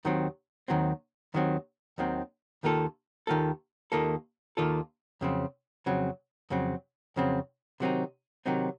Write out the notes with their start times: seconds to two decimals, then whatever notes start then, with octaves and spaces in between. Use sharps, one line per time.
0.05 D#2 D#3 F#3 C4
0.68 D#2 D#3 F#3 C4
1.34 D#2 D#3 F#3 C4
1.98 D#2 D#3 F#3 C4
2.63 D#2 D#3 A#3 F4 A4
3.27 D#2 D#3 A#3 F4 A4
3.92 D#2 D#3 A#3 F4 A4
4.57 D#2 D#3 A#3 F4 A4
5.21 F2 C#3 F#3 C4
5.86 F2 C#3 F#3 C4
6.50 F2 C#3 F#3 C4
7.16 F2 C#3 F#3 C4
7.80 C3 D#3 F#3 C4 D#4
8.46 C3 D#3 F#3 C4 D#4